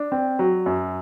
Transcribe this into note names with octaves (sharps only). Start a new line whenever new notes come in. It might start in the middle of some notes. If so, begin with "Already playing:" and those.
Already playing: D4
C4
F#3
F#2